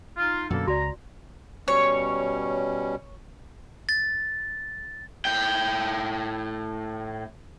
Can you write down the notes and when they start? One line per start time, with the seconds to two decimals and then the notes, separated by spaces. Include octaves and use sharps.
0.17 D#4 F4
0.50 F#2 B2 D3 G3 A#3 A4
0.67 C#2 F#4 D5 A#5
1.68 B2 G3 C#4 C#5
3.89 A6
5.25 A2 G5